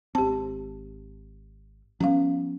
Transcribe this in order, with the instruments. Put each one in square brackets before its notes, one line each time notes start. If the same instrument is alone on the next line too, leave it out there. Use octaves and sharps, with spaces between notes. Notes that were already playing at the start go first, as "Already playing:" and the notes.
[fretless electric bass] G#1 C4 [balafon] G4 A5
[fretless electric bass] F3 G3 B3 [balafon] C#4 F5